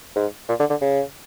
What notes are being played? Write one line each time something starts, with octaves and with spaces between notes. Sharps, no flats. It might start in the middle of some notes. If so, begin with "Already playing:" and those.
G#2
A#2
D3
D3
C#3